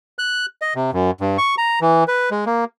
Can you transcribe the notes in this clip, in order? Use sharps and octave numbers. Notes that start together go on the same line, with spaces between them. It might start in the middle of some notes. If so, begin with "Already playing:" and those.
F#6
D#5
C3
F#2
G2
C#6
A#5
E3
B4
G#3
A#3